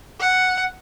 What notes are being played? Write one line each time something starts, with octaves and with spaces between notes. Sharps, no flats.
F#5